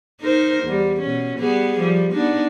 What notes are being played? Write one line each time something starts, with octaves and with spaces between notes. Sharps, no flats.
D#4 A#4 C5
E2 G3
B2 C#4
G3 B3 G#4
F3 G3
B3 D4 D#4